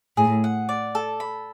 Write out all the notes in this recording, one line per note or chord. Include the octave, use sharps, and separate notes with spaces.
A2 G#4
F#5
D5
A4
B5